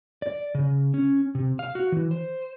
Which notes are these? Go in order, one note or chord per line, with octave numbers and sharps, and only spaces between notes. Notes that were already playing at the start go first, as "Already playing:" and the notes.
D5
C#3
C#4
C3
F5
F#4
E3
C5